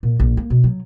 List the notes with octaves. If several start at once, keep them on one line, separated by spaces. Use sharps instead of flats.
A#2
A#1
A#3
B2
F#3